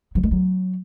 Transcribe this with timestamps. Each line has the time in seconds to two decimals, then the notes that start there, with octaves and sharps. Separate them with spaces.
0.15 F#3
0.23 G#3
0.31 F#3